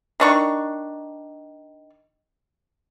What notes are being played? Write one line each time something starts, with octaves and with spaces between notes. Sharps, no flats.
D#3 D4 C#6